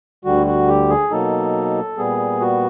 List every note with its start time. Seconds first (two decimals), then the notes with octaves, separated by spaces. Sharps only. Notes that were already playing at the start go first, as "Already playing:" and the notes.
0.25 D2 D3 G3 F#4
0.47 F#4
0.68 G4
0.89 G#4
1.11 B2 F#3 A#3 D#4 A4
1.98 A#2 G3 B3 G#4
2.40 F#4